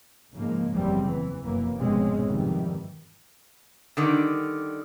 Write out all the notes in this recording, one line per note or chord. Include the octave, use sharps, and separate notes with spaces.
G#2 C#3 F3 G#3 A#3
F#1 E2 C#3 G3 C4
E3
F1 F#2 E3 A#3
F1 G#2 B2 G#3 C4 C#4
F2 G#2 C3 D#3 E3 G3
D3 D#3 G3